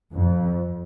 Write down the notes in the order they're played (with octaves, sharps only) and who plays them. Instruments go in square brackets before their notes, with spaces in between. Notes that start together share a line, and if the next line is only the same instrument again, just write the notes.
[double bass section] F2